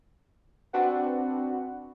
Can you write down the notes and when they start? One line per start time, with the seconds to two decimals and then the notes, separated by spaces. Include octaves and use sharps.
0.73 C4 D4 F#4 B4 F#5